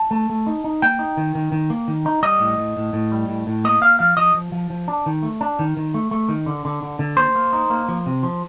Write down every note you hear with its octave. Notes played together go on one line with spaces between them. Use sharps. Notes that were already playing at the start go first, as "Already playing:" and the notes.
Already playing: A5
A3
A3
D#4
D#4
A#3 G5
D#4
D#3
D#3
D#3
A#3
D#3
D#4
G3 D#5
A2
A2
A2
A2
G3
A2
A2
A#3 D#5
A#3 F5
F3 F5
F3 D#5
F3
F3
F3
D4
D#3
A3
D4
D#3
D#3
A3
A3
D#3
D3
D3
D3
D3
A#3 C5
A#3
D#4
A#3
F3
C3
F3